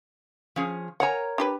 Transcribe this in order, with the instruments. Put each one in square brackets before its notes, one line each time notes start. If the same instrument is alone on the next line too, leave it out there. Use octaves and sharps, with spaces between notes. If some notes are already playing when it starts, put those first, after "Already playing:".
[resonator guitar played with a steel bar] F3 C#4 G#4
[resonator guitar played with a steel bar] A#4 C#5 A#5 [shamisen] F#5 G#5
[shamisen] D4 G4 B4